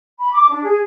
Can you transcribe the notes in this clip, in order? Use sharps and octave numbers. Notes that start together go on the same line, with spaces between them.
B5
D6
D4
G#4